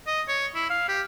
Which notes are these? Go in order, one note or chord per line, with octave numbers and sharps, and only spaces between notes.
D#5
C#5
E4
F5
G4